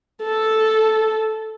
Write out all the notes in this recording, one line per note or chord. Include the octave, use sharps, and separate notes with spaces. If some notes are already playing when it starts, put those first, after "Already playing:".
A4